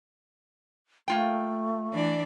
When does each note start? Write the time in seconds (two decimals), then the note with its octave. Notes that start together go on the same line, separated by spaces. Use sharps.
1.08 A3 A#3 F4 G5
1.93 E3 D4 D5